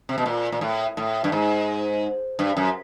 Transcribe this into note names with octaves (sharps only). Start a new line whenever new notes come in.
C3
B2
A#2
A#2
A2
A2
G2
G#2
G2
F#2